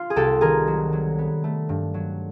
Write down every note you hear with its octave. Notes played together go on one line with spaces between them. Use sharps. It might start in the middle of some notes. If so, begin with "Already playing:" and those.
Already playing: F4
G#4
C2 G4 A4
D#3 G#4 A#4
F#3
F#3
B3
A3
G2
F#3